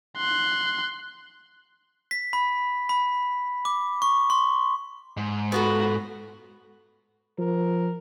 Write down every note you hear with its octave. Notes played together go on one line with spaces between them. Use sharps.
C6 F#6
B6
B5
B5
D6
C#6
C6
G#2
B3 F4 F#4 A4
F3 A#4